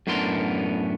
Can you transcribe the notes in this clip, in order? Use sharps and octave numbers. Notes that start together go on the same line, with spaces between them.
F#2 A2 B3 D4 A#4 C6